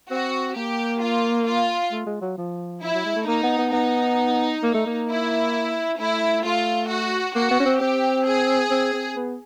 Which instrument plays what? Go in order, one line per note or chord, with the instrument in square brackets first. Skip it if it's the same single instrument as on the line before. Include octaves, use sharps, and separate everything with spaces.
[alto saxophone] C4 [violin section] F#4
[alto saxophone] A#3 [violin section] G4
[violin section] F4
F4
[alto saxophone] A3
G#3
F#3
F3
[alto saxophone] F3 [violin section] E4
[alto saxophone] F#3
G#3
A3
[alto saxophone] A#3 [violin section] D#4
[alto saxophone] B3
B3
[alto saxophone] B3 [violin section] D#4
[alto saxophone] A#3
A3
A#3
[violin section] E4
[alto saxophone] A3 [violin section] E4
[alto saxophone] A3 [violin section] F4
[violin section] F#4
[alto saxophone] A#3 [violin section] F#4
[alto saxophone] B3
C#4
C4
[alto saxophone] C4 [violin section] G4
[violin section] G#4
[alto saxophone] C4
C4
B3